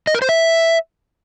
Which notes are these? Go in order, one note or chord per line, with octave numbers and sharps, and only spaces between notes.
D#5
A#4
C5
E5